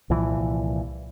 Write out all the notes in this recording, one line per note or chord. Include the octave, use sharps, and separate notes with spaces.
C2 A#2 E3 F3